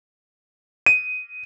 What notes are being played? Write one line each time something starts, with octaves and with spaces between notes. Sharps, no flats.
D#7